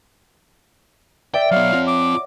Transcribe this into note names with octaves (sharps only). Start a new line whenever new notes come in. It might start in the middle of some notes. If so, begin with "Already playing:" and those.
D5 E5 G5
F#3 B3 C#5 F5 F#5
C4 F4 A#6
D6